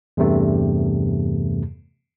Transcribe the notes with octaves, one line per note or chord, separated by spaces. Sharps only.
E2 G2 C3 A3